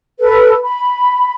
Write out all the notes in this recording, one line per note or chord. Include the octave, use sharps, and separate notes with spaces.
A4 B4
B5